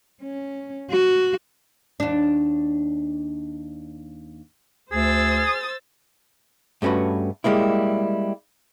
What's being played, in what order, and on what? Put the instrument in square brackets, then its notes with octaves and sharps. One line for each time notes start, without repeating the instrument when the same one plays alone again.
[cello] C#4
F#4
[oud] D#2 D4
[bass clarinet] D2 [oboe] G#4 [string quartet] C5 E6 A6
[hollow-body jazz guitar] G2 A3 C#4 F#4 B4
G3 G#3 A#3 E4